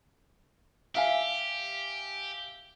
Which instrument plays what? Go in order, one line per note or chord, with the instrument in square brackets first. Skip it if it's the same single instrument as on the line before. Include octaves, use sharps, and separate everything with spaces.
[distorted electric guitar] G4 [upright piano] E5 F5 G#5